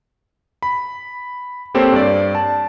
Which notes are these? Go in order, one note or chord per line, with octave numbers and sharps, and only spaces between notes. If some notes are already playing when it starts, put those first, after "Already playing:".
B5
A#3 C4 G4 A4 C5 C#5
G2 D5
A5